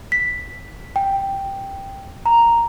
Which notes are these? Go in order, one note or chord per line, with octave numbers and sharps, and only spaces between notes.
B6
G5
A#5